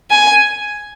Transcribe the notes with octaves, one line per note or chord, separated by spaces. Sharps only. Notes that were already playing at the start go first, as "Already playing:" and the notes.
G#5